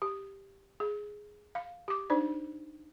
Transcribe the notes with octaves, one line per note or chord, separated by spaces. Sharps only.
G4
G#4
F5
G4 D6
D4 D#4 C5 D5